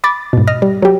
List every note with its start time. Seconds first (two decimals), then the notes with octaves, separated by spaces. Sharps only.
0.04 B5 D6 A6
0.33 G#2 B2
0.47 D#5 F6 A#6
0.62 G3
0.82 F#3 G4